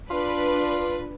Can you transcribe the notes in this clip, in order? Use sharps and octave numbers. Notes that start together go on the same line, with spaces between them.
D4 F4 B4